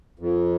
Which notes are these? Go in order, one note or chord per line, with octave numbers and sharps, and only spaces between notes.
F2